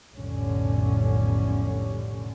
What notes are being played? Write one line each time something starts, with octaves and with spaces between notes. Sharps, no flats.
F1 B1 A2 D3 G3 C#4